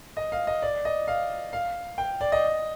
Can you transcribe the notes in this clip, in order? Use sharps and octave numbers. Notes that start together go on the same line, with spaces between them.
D#5
F5
D#5
D5
D#5
F5
F5
G5
D5
D#5